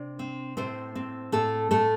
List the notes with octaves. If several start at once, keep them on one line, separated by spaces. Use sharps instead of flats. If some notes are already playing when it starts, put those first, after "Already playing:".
Already playing: C3 D4 D5
C4
A2 C4 C5
C4
A2 A3 A4
A2 A3 A4